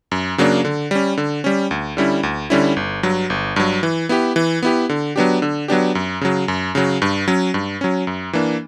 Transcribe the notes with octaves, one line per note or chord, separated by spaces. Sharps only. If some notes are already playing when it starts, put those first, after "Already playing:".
F#2
C#3 F#3 A#3 D4
D3
G3 C#4
D3
G3 C#4
D2
D3 G3 C#4 E4
D2
D3 G3 C#4 E4
G1
G2 F#3
G1
G2 F#3
E3
B3 E4 G4
E3
B3 E4 G4
D3
F#3 B3 D4 G4
D3
F#3 B3 D4 G4
F#2
C#3 F#3
F#2
C#3 F#3
G2
F#3 C#4
G2
F#3 C#4
F#2
E3 A#3 D4